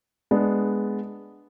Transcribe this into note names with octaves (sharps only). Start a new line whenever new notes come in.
G#3 B3 D4